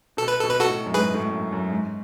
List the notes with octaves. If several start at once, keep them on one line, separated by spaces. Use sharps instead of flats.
B2 A4
B4
B2 A4
B4
F#4 A4
A2
F#2
G#2 G#4 B4
A2
F#2
F#2
G#2